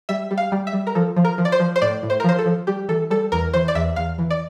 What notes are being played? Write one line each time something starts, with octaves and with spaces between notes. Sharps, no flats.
G3 E5
G3
F5
G3
E5
G3
A#4
F3 A4
F3
A#4
F3
D5
C5
F3
C5
A2 D5
A2
C5
A#4
F3 C5
A4
F3
G3 G4
E3 A4
G3 A4
E2 A#4
E3 C5
D5
E2 E5
E2 F5
E3
D5